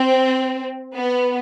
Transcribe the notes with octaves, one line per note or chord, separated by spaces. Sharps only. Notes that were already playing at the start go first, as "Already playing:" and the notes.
Already playing: C4
B3